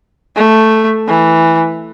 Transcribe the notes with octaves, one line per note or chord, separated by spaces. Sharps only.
A3
E3